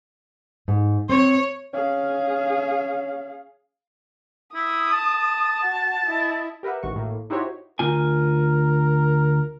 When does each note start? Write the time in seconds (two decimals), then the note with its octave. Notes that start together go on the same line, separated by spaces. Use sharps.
0.68 G#2
1.09 C4 C#5
1.74 C#4 G#4 F5
4.55 E4 D#6
4.92 A5
5.64 F#4
6.06 E4 D#5
6.63 G4 A#4 B4 E5 F#5
6.83 A1 G#2 D#3 F#4 C#6
6.96 A2 A#3
7.30 D#4 E4 F#4 G4 C5 C#5
7.79 D2 F4 A#4 G#5